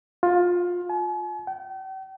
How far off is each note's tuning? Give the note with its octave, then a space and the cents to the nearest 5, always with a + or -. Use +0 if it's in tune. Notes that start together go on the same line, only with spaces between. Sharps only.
F4 +20
G#5 +45
G5 -40